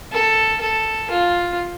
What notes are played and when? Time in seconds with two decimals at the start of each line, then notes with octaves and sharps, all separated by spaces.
0.12 A4
0.61 A4
1.11 F4